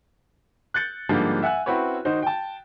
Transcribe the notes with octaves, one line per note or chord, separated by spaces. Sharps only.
F#6 G6 A6 C#7
G#2 D3 F3 G3 A#3 D4
E5 F#5 G#5 F#6
C4 C#4 E4 F#4 B4 C#5
D#3 D#4 F#4 C5
G5 A5